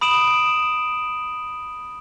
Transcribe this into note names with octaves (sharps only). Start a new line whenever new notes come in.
B5 D#6 D7 E7 F#7